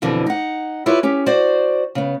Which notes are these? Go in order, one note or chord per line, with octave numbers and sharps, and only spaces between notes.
F2 B2 D3 E3
D#4 F#5
E4 F4 G4 B4 C#5
C#4 G4
F#4 C5 D5
C#3 B3